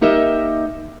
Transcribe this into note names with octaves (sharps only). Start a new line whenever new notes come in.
A#3 D#4 G4 A#4 D#5 E5